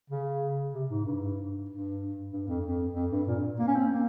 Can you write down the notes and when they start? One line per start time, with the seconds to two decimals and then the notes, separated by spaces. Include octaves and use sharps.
0.10 C#3
0.73 C3
0.89 G#2
1.05 G2
1.69 G2
2.32 G2
2.47 F2
2.64 F2
2.95 F2
3.11 G2
3.27 A#2
3.59 A#3
3.68 C#4
3.75 C4
3.91 A#3